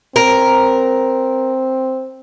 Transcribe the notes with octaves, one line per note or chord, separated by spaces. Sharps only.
C4 A#4